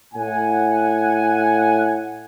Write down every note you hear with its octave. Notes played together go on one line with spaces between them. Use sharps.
A2 F#5 G#5